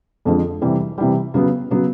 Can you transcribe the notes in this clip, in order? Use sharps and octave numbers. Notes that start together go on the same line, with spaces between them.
F2 D3 F3 G#3
C3 E3 G3
C3 E3 G3
C#3 F#3 B3
C#3 F#3 B3